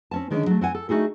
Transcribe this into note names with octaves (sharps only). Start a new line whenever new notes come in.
C4 C#4 A5
D3 D#3 G#3 C#4 D4
F#3 A3
C4 F#5 G#5
A4
A3 D#4 F#4 G#4 A4